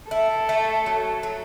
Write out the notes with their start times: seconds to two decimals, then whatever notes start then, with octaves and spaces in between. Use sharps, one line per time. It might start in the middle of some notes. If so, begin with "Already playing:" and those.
0.11 E4 A4
0.49 A3
0.86 F#3
1.23 F#3